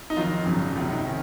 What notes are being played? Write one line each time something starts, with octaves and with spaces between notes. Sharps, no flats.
D#4
F2 D#3 F#3 F4
G#1 F#2 C#3 F#3
C#2 C3 F#3 F4
D#4
D#3 C#4